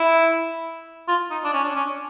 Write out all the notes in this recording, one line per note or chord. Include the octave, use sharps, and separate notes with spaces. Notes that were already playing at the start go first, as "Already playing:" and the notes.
Already playing: E4
F4
D#4
D4
C#4
D4
C#4